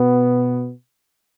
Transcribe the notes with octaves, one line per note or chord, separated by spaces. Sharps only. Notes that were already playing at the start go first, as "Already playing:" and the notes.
Already playing: B2 B3